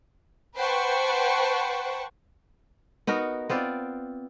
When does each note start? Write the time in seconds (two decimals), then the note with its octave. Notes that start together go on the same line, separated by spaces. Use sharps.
0.57 B4 C5 F#5 G5 A5 C#6
3.07 B3 D#4 F#4 A#4
3.49 B3 C4 F4 D5